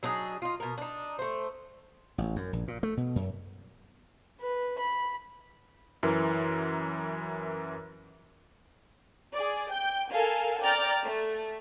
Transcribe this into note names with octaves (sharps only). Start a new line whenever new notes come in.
F#3 D4 D#4 G#4
F4 D#5
B2 A#4
D4 D#4
A3 C5
A1
F#2
A#1
A#2
A3
B2
F#2
B4
B5
F#2 E3 A#4
G#4 D5
G5 G6
A4 A#4 F5 G#5
D5 G5 A#5 F6 A6
A3